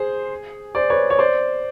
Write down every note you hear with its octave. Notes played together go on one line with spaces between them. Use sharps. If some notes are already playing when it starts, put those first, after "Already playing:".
Already playing: G#4 C5
C5 D5
B4 C#5
C#5
C5 D5